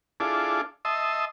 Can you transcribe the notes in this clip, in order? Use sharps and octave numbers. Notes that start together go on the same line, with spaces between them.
D4 E4 F4 G#4 A4 D6
D#5 E5 A5 C6 D#6 E6